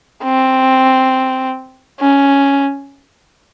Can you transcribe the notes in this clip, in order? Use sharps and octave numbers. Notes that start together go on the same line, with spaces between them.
C4
C#4